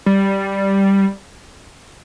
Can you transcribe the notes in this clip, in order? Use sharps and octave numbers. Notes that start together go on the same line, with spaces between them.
G3